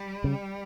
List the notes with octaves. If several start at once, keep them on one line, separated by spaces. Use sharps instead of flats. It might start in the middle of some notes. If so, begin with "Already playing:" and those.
Already playing: G3
C#3